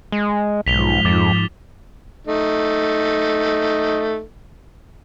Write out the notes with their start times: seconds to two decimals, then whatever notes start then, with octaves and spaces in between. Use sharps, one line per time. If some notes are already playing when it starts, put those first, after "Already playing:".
0.12 G#3
0.66 B1 G#2 F3 B6 F7 G7
1.05 F2 D6 A6
2.27 A3 D#4